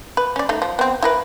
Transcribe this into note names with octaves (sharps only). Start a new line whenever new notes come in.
B4
C#4 D5
A3 D#4
F3
B3 C4
E4 A#4 B4